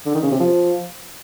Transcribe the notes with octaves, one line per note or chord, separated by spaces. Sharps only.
D3
D#3
C#3
C3
F3